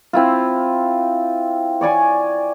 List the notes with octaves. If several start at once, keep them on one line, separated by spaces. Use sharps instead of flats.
C4 E4 F4
C#5 D5 G#5 C#6